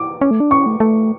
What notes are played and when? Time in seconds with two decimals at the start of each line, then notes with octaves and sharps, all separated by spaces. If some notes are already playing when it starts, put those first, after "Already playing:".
Already playing: D6
0.21 C#4
0.31 A3
0.40 D4
0.51 C#4 C#6
0.66 A3
0.80 A3